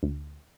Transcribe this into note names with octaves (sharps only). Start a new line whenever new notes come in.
D2